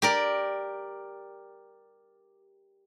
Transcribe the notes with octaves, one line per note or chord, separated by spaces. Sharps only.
G4 A#4 D5